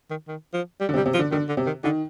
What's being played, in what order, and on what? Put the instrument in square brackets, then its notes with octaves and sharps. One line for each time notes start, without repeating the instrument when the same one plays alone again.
[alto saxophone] D#3
D#3
F3
G3
[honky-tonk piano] D3
C3
[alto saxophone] G3
[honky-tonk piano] C3
[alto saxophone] F3
[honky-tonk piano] D3
[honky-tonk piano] D3 [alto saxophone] D#3
[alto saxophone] D3
[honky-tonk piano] C3
[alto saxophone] D#3
[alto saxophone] D3 [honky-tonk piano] D#3